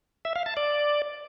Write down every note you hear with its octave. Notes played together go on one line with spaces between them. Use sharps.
E5
F5
A5
D5